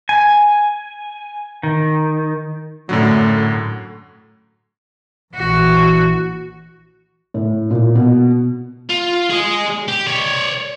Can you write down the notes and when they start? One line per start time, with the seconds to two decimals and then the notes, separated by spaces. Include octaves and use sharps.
0.09 G#5
1.63 D#3
2.89 F#2 A2 D3 F#3
5.35 A#1 E3 F#4
7.34 A2
7.71 A#2
7.95 B2
8.90 F4
9.30 G#4 D#5
9.88 G4
10.07 C#5 D5